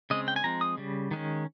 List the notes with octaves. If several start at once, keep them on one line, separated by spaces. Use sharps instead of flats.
C#3 G#3 C4 D#5
G5
G#5
F3 G#3 C4 A#5
D#6
C#3 G3
D#3 G#3 C#4